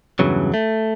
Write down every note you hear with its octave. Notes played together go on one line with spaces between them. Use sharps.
E2 G2 C#3 E3 F#3
A3